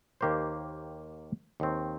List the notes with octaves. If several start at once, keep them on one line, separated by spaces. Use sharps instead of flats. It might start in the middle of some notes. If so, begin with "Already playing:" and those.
D#2 D#3 A#3 G4 C5
D#2 D#3 C4